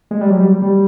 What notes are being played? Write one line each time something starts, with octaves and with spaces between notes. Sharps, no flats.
G#3
G3
F#3
G3
G3